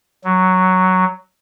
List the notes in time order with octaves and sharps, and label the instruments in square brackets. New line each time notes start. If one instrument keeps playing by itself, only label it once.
[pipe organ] F#3